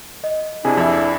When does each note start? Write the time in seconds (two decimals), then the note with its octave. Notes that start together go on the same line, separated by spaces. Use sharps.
0.24 D#5
0.65 C3 D4 E4 G#4 G#5
0.77 F2 E5